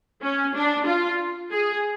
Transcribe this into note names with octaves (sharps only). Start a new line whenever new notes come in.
C#4
D4
F4
G#4